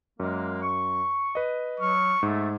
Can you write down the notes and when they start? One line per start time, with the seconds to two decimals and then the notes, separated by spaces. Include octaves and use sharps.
0.20 F#2 G#3 A#3
0.63 C#6
1.35 B4 D#5
1.80 F#3 C#6 F6
2.23 G#2 A3